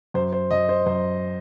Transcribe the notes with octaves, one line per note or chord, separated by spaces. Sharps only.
F#2 C5
C5
F#2 D#5
C5
F#2 C5